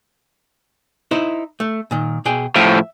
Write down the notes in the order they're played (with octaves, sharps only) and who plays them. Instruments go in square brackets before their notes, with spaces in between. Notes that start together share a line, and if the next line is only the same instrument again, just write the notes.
[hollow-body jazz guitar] D#4 E4 C5
A3
A#2 D#3
B2 G#4 G5
[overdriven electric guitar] A2 F3 [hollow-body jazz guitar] E5